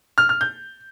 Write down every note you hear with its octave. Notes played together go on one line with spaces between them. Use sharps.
F6
F6
G6